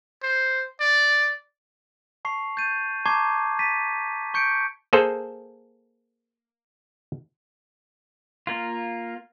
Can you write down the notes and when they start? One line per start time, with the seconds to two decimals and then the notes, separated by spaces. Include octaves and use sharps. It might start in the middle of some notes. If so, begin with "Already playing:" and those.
0.23 C5
0.80 D5
2.25 A5 C#6 C7 F7
2.57 G6 A6 D#7
3.06 A5 A#5 C#6 D6 G#6 C7
3.59 A6 B6 D#7
4.34 C#6 G6 C#7 D7
4.93 A#3 G#4 A4 C5
8.47 A#3 F4